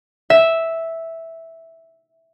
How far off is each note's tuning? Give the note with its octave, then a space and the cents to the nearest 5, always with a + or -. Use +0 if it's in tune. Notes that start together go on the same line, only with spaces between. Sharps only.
E5 -5